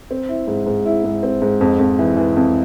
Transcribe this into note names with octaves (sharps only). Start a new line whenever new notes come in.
C4
E4
G#2
G#2
E4
G#2
C4
G#2
F2
F2
E3
E3
F2